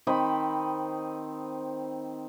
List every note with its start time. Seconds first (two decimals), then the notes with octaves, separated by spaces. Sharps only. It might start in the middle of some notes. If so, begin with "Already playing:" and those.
0.07 D#3 C4 D#5 B5